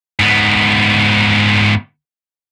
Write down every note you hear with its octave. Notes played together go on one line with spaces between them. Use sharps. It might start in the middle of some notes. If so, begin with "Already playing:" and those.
G#2 B3